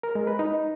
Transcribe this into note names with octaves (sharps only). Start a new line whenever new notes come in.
A#4
G#3
B4
D#4